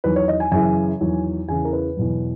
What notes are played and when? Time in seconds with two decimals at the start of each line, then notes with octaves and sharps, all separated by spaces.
0.04 E2 D#3 F#3 B4
0.16 C#5
0.28 D#5
0.40 G#5
0.52 F#2 C#3 E3 G#5
1.00 E2 D#3 F#3
1.48 E2 C#3 E3 G#5
1.65 A#4
1.73 B4
1.97 E2 B2 F#3